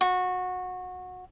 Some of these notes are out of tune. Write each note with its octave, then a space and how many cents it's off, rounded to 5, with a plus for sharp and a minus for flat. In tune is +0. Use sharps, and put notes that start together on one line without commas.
F#4 -20